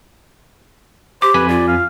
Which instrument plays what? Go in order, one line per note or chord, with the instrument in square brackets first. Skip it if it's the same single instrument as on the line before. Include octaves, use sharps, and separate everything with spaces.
[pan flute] G4 [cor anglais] C5 [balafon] D6
[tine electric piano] F2 G#5 B6 [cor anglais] B4
[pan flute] F4 [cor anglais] D5
[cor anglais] F5